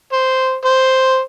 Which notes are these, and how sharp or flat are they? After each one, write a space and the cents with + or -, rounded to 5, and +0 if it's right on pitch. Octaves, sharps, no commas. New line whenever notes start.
C5 -5
C5 +0